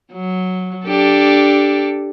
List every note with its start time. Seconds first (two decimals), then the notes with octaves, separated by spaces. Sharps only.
0.13 F#3
0.86 D4 G4 A4